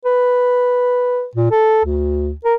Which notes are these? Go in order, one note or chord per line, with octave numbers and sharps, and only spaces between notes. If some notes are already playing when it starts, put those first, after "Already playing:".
B4
A#2
A4
D2
A#4